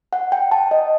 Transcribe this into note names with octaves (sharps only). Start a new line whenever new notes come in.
F#5
G5
A5
D#5